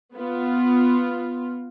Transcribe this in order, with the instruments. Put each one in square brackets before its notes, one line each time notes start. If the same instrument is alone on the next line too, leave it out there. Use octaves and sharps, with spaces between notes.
[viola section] B3 F4